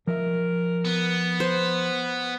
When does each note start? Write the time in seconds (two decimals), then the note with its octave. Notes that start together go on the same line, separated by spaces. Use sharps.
0.07 F3 A#4 D#5 E5
0.85 B3
1.40 B4 C5